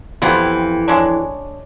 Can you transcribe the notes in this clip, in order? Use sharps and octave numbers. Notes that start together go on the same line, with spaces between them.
F2 E3 B3 F4 G4
G#3 C#4 D4